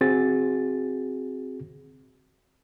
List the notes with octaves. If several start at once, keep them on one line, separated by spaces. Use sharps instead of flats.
C4 F#4 G#4 A6